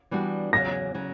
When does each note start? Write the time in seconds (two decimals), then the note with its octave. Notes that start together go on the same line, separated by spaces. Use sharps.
0.11 E3 G3 B3 D4 F#4
0.53 E2 C#3 F#3 C#4 A#6
0.94 C#3 F#3 C#4